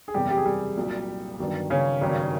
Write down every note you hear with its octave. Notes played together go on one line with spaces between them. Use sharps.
G#4
F#1 E2 C3 G3 G4
G3 G4
G#4
G3 G4
C2 A#2 F#3
G1 G2 D#3 F#3
C#3 C#4
G#1 G2 D#3 F#3